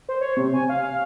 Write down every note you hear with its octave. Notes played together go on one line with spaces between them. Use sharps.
C5
C#5
C3
G#5
F5
F5